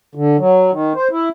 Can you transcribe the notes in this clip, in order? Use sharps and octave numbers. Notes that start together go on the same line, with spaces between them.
D3
F#3
D#3
C5
E4